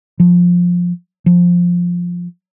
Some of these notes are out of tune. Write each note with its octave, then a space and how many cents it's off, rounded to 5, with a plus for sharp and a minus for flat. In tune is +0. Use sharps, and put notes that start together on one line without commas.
F3 +15
F3 +10